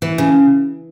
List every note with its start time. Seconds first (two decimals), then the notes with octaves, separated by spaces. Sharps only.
0.02 E3
0.18 C#3